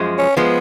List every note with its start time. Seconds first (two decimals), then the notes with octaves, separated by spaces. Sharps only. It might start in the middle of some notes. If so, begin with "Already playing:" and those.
Already playing: F#2 F3 G#3
0.19 C#4
0.37 F3 G#3 B3